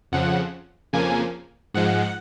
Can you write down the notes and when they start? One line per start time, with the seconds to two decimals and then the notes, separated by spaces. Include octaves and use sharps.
0.12 F2 C#3 F3 F#5
0.93 F2 C#3 F3 A#3 G#5
1.74 G#2 F3 G#3 F#5